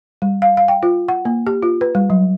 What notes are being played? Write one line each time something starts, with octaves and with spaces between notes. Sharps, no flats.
G3
F5
F5
G5
F4
F#5
A#3
G4
F4
B4
G3
F#3